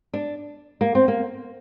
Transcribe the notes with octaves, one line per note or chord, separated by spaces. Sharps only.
D4
A#3
C4
A#3